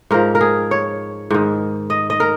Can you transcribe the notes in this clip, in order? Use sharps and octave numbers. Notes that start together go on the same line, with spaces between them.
G#2 F3 A#4
A#4
G#4
C#5
G#2 D#3
D#5
D#5
A#4